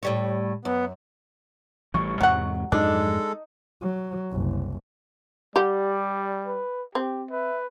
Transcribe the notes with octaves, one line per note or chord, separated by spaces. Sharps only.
A2 G3 C#5
F#2 B3
A1 E3 G3 C#6
E2 G#2 C3 F#3 F#5
F2 G#2 F#3 G#3 D4 D#4 A4
F#3
F#1 C2
G3 G4 D5 F#5
B4
C4 G4
B4 E5